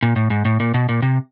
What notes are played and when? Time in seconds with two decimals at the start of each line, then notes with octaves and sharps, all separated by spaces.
0.03 A#2
0.16 A2
0.30 G#2
0.45 A2
0.60 A#2
0.74 B2
0.89 A#2
1.02 C3